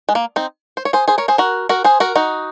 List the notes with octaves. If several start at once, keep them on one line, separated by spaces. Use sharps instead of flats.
G#3
A#3
C4 D#4
C5
C#5
G#4 C5
G#4 C5
A#4 C#5
G#4 C5
F#4 A#4
F#4 A#4
G#4 C5
F#4 A#4
D#4 F#4